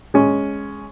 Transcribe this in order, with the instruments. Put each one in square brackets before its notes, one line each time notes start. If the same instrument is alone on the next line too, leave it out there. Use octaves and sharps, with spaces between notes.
[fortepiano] G#3 C#4